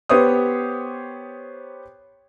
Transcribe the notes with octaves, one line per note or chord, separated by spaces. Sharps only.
B3 G4 C5 C#5 D#6